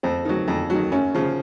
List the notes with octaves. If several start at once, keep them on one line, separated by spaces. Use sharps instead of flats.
F2 C4
D#3 F#3
F2
D#3 F#3
F#2 C#4
C#3 F3